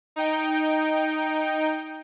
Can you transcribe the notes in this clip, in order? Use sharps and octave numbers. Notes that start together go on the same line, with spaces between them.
D#4 G5